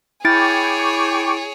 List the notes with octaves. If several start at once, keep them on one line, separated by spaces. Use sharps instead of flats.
E4 G#4 C#5 G5 C#6 D6 A6